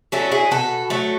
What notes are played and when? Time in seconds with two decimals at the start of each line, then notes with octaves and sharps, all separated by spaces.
0.12 F#3 A3 C#4 E4
0.31 E4 G#4
0.51 B2 F#4 A4
0.90 F#3 A3